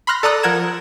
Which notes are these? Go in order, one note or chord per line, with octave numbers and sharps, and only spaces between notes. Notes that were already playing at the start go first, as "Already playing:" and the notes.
B5 C6 F6 F#6 A#6
A4 D5 A5 A#5 D#6 F#6
F3 A#4 F#5 G#6 E7